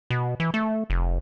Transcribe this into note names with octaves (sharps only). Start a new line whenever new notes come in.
B2
E3
A3
F1